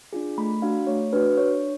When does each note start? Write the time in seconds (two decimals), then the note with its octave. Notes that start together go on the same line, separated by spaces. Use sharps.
0.13 D4 F4 G#4
0.38 A3 B5
0.62 D4 F#4 F5
0.87 A3 C#5
1.13 D4 F#4 B4
1.37 D4 C#5